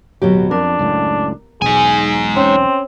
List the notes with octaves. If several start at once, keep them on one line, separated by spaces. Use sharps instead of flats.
D1 B2 F#3 G4
F2 D4 A#4
C#2 F#2 A2
E1 B1 D#4 G#4 G#5
C4 C#4